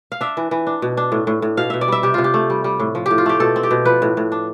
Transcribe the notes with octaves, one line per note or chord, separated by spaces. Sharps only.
F5
D4 E5
E3
E3
D4
B2
D4
A2
A2
A2
B2 F5
B2 E5
D5
G3 E5
C3 G4
C3 F4
G4
A3
G3
G3
A2
F3
A2 G4
F4
A3 G4
B2 A4
C4
G4
B2
F3 B4
A2
A2
D4